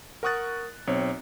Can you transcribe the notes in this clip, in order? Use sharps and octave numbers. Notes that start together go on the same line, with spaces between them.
A#4 F#5 C#6 D#6 F#6 A6
B1 C4 C#5